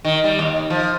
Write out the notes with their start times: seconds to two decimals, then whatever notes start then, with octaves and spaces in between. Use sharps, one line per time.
0.05 D#3
0.24 G3
0.39 D#2
0.70 F3